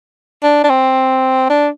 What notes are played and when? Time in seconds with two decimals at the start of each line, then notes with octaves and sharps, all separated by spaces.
0.43 D4
0.64 D4
0.70 C4
1.50 D4